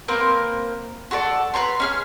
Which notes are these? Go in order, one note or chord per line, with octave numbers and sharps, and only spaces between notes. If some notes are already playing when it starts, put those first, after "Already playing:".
A#3 C4 A#4 B4
F#4 A4 B4 D5
B4 C#5 A#5 C6
C#4 G#4 F6